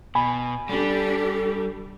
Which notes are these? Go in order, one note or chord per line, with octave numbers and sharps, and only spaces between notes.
B2 G#5 B5
G3 D4 G4 A4